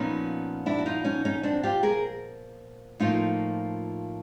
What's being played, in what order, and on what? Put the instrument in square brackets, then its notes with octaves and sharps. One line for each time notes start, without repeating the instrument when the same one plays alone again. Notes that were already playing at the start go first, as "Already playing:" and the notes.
Already playing: [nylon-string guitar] A#2 F3 B3 C#4 D#4
D4 E4
F#4
D#4 F4
C#4 D#4
C#4 D#4
C4 D4
F4 G4
G#4 A#4
A2 F3 A#3 D#4 F4